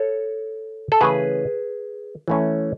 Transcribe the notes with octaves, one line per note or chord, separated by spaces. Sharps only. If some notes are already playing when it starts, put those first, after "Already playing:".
Already playing: A4 C#5
A4
C#3 E3 A3 C#4 G#4 B4
E3 A3 C#4